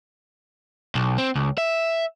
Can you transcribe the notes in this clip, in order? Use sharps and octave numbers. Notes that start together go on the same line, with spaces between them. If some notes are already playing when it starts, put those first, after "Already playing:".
B1
C4
C#2
E5